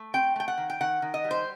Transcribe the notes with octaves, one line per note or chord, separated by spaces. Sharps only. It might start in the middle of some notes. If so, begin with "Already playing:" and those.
Already playing: A3
C4 G5
A3 G5
F#5
D#3
G5
D#3 F#5
D#3
D#5
G3
C5